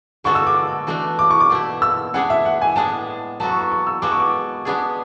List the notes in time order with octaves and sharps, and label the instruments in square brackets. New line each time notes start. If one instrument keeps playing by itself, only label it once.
[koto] D3 G#3 B3 F#4 A4 [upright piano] C#6
[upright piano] E6
D6
[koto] E3 A3 D4 F#4
[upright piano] D6
C#6
D6
[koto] B2 A3 E4
[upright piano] E6
[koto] C#3 E3 G#3 D4 G#4 [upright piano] F#5
[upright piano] E5
F#5
G#5
[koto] A2 G#3 B3 D4 G#4 [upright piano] A5
[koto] F#3 B3 F#4 A4 [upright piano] A5
[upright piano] C#6
C#6
C#6
E6
[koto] G#3 B3 F#4 A4 [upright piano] D6
[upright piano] C#6
D6
[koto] G#3 B3 D4 G#4